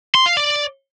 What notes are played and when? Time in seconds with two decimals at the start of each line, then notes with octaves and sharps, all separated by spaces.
0.15 C6
0.26 F5
0.37 D5